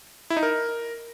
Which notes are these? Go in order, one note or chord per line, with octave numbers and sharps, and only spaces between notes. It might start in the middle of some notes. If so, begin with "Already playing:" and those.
E4
D#4
A#4